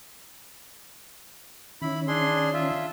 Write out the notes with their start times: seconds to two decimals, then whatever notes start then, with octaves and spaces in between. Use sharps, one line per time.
1.82 D#3 C#4 E4 B5
2.08 D4 G#4 C6
2.54 F4 E5